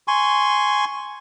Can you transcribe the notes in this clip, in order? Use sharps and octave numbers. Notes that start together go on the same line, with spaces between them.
G#5 C6 C#6